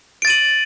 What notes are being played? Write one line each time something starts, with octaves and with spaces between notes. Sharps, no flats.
A6 D7 D#7 F#7